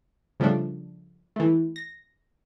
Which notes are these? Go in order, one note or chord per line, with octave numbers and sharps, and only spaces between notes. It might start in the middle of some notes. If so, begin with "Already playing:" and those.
C#3 F3 G3 A3 D4
E3 A3
A#6